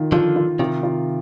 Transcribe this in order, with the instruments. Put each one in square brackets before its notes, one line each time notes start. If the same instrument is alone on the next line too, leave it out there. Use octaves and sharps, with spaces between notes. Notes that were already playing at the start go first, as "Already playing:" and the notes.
Already playing: [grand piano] D#3 F4
[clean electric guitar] D3 F3 [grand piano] F4
[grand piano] F4
[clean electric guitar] C3 D#3 [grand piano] F4
[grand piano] F4